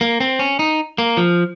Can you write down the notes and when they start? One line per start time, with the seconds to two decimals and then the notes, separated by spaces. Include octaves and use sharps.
0.01 A#3
0.20 C4
0.39 C#4
0.59 D#4
0.98 A#3
1.17 F3